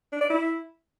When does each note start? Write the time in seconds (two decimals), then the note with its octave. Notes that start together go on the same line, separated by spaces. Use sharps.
0.13 D4
0.21 D5
0.30 E4